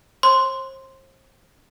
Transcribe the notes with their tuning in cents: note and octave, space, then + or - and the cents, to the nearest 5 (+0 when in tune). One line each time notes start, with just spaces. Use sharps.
C5 +35 C6 -5